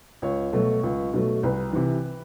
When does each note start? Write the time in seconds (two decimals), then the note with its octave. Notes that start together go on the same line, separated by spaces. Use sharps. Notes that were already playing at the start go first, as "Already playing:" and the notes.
0.22 C#2 C#5
0.53 B2 F#3 A3
0.83 C#2
1.14 B2 F#3 A3
1.43 C2 B4
1.73 C3 E3